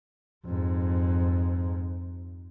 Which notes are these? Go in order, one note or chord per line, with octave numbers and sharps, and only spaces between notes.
F2 G#2